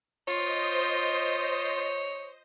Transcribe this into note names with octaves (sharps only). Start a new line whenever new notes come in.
F4 C5 C#5 D#5